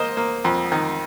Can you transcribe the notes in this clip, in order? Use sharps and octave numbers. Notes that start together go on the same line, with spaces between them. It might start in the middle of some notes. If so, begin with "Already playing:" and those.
Already playing: A#3 C5 D#5
A#3
F2
D#3